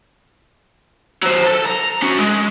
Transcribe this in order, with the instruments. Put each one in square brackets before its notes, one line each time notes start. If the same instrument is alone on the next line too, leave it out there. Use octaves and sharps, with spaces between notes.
[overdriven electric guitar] F#3 C5
A4
A#5
C#4 F#4
G#3